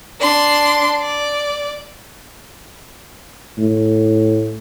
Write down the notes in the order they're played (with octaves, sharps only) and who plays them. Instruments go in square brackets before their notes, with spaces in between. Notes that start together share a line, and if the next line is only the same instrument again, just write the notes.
[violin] D4 C6
D5
[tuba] A2